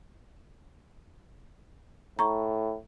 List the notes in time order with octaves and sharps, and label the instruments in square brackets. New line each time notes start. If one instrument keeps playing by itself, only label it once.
[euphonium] A2 [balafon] A#5 C#6